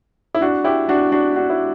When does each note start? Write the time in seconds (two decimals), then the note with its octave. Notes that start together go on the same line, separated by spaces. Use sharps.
0.35 E4
0.41 D4 F#4
0.64 E4 G4
0.89 D4 F#4
1.12 D4 F#4
1.36 D4 F#4
1.50 E4